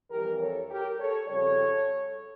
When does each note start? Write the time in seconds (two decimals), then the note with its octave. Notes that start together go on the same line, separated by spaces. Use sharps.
0.11 F2 E3 G3 G4 A#4
0.40 A4 C#5
0.69 G4 A#4
0.98 A4 C#5
1.27 F2 C#3 G3 A4 C#5